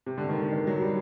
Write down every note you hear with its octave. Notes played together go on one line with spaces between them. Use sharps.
C3
D3
D#3
D3
D#3
F#3
G3